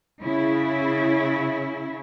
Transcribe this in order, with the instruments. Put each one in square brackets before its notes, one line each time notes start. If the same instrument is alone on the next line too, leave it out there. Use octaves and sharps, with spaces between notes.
[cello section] C#3 E4